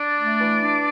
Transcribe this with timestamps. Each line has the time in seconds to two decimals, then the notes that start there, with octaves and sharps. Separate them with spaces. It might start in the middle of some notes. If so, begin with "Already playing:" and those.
Already playing: D4 D5
0.17 A3
0.40 E3
0.63 D4